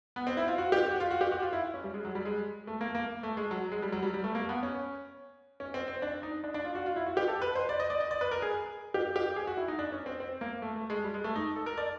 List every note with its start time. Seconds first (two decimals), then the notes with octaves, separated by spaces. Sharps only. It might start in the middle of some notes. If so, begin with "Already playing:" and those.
0.16 B3
0.27 C4
0.37 E4
0.48 F4
0.58 F#4
0.72 G4
0.86 F#4
1.00 F4
1.11 F#4
1.21 G4
1.31 F#4
1.42 F4
1.53 E4
1.74 C#4
1.84 G3
1.94 G#3
2.05 F#3
2.15 G3
2.25 G#3
2.67 A3
2.81 A#3
2.95 A#3
3.23 A3
3.37 G#3
3.51 F#3
3.72 G#3
3.82 G3
3.92 F#3
4.03 G3
4.14 G3
4.24 A3
4.35 A#3
4.49 B3
4.63 C#4
5.60 C#4
5.74 C4
5.88 C4
6.02 D4
6.23 D#4
6.44 D4
6.54 D4
6.65 F4
6.75 F#4
6.86 F4
6.96 E4
7.06 F#4
7.17 G4
7.28 A4
7.42 B4
7.55 C5
7.69 D5
7.80 D#5
7.90 D5
8.00 D#5
8.11 D5
8.21 B4
8.31 A#4
8.42 G#4
8.94 G4
9.16 G4
9.36 G#4
9.47 F#4
9.57 E4
9.68 D#4
9.79 D4
9.92 C#4
10.06 C4
10.20 C4
10.41 A#3
10.62 A3
10.76 A3
10.90 G#3
11.04 G3
11.14 G#3
11.24 A3
11.36 D#4
11.56 A4
11.66 A#4
11.78 D5